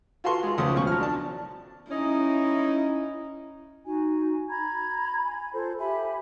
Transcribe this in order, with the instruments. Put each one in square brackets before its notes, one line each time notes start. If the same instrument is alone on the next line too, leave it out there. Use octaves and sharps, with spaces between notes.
[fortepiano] F4 F#4 A4 B4 C6 C#6
G#3 F4
C#2 F3 A3 C#4 D#6
B2 F3 C#6
F#3 F6
D4 A5
[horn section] C#4 D#4 [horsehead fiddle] E4
[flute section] D#4 F#4 G#5
A#5 B5 G#6
G#5 B5
F4 A4 C5
G4 E5 G#5 B5